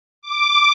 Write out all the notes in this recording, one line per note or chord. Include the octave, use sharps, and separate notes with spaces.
D6